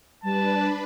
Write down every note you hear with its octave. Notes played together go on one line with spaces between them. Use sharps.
G3 D4 B4 A5